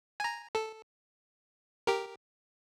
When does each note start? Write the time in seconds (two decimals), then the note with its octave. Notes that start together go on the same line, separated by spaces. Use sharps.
0.20 G#5 A#5
0.55 A4
1.87 G4 A#4